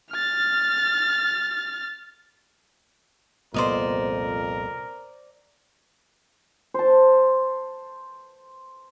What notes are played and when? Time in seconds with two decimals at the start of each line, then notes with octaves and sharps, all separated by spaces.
0.11 F6 A6
3.54 C2 F2 A#2 B3 A#4 C5 D5 D#5
6.74 C5 A5